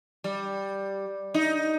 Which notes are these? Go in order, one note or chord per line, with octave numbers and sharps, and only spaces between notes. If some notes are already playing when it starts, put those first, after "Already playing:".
G3
D#4